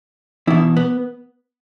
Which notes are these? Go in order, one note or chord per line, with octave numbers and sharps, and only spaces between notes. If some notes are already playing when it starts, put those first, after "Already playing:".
E2 B2 E4
B3